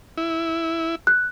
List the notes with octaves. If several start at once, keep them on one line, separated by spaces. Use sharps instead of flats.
E4
F#6